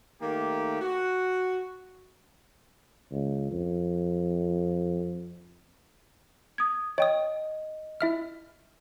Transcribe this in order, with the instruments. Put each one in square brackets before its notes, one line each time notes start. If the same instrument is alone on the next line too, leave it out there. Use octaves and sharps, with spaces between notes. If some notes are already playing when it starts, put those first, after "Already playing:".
[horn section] D#3 A3 A#3 G4
F#4
[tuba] C#2
F2
[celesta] D#6 G#6
[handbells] C#5 G5 D#6 [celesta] D#5
[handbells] E4 E5 F6